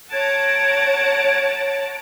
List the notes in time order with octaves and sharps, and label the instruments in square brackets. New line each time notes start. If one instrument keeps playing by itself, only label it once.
[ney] C#5 [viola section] F#5 A5 A#5 [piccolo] G#6 [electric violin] D7